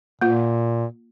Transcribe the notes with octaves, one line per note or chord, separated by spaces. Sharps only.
A#2 A#3 F4